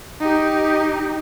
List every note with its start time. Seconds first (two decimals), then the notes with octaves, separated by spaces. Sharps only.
0.20 D#4 G4